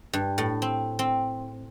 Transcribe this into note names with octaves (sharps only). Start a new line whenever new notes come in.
G2
A2
C4
C4